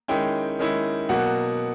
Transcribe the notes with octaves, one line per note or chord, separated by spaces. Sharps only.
D#3 G#3 C#4 E4 G5
D#3 G#3 C#4 E4
B2 F#3 A#3 F#5